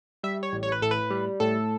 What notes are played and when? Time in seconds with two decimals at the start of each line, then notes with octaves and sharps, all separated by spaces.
0.23 G3 E5
0.43 C#5
0.53 A1
0.63 C#5
0.72 B4
0.82 A2 A4
0.91 B4
1.10 G3
1.40 A2 A4